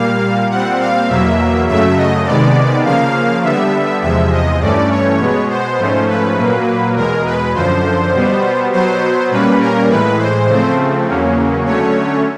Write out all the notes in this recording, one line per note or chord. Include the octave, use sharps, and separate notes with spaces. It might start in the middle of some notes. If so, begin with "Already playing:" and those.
Already playing: A#2 G3 A#3 F5
A#2 G3 C4 F#5
F5
E2 B2 F#3 A#3 E5
F#2 C#3 F#3 A3 E5
D#5
C3 D#3 G#3 B3 D5
C#3 F3 A#3 F5
D3 G3 B3 E5
E2 C3 F3 G#3 E5
D#5
G2 E3 A3 C#4 D5
C#5
B2 G#3 B3
C5
G#2 F3 A3 C#4
B4
A#2 F#3 A#3
E2 B2 G#3 A#4
B4
F#2 D3 F3 C5
B2 G3 B3
B2 F#3 B3 C5
A#2 G3 A#3 C#4 B4
A#4
A2 E3 G#3 B4
C5
C#3 F3 A3 C4
E2 C#3 F#3 A#3 C#4
D3 F#3 A3 C#4 C#5